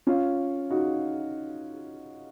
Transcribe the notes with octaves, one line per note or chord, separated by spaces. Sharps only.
C#4 F4
D#4 F#4